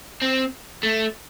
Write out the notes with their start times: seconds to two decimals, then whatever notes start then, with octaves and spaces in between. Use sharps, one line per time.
0.22 C4
0.83 A3